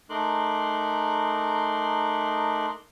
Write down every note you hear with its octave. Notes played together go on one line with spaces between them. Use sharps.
A3 D#4 A#4 C6 D6 F#6